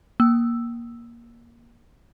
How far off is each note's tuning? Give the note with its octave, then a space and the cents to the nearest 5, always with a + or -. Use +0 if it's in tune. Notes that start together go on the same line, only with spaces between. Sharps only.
A#3 +15 E6 +0